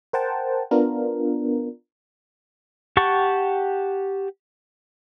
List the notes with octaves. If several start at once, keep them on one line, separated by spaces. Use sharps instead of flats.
A#4 C5 F#5 G5 A5
B3 D4 F4 A#4
G4 F#5 G5 A5 C#6